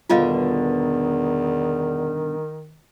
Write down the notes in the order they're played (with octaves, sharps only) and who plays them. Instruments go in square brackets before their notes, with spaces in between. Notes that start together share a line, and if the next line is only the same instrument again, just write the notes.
[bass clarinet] E2 [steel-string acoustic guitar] G2 B2 D3 [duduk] D#3 [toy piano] F4 D#5 F5